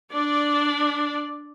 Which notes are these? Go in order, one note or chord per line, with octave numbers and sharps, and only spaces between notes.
D4 D5